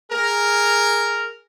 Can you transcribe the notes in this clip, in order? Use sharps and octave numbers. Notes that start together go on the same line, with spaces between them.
G#4 A#4